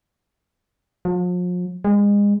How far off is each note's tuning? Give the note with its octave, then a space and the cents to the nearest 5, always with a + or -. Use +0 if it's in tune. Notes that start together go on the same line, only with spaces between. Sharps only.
F3 +40
G#3 -30